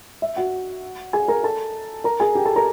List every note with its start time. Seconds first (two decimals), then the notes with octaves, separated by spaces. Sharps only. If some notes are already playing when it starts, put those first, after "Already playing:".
0.22 E5
0.36 F#4 F#5
1.13 G#4 G#5
1.28 A#4 A#5
1.43 A4 A5
2.04 A#4 A#5
2.20 G#4 G#5
2.35 G4 G5
2.46 A4 A5
2.56 A#4 A#5